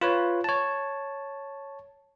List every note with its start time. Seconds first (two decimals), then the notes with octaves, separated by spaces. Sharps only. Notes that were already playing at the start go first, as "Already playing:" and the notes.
0.01 F4 B4 C#5
0.44 C#5 A5